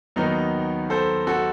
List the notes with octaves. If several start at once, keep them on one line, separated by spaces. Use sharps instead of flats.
D#2 D#3 F#3 B3 D#4
A4 C5
F#4 A4